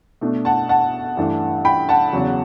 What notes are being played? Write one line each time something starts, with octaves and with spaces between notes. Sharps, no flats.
B2 A3 D4
F#5 A5
F#5 A5
G2 E3 A3 D4
G5 B5
F#5 A5
E2 C#3 F#3